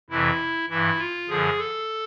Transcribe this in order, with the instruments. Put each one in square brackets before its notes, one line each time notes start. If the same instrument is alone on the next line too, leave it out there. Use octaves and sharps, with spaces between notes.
[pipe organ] F2 C3 E3 E4
G2 E3 E4
F4
F#2 D3 F3 G#4
A4